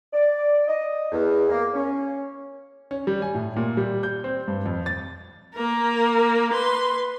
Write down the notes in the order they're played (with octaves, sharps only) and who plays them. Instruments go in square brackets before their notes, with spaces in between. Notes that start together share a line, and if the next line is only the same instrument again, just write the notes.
[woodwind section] D5
D#5
E2
A#3
C#4
[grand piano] C#4
G3
G#5
A2
A#2
G3
G6
C4
G2
F2
A6
[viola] A#3 A#4
B4 C6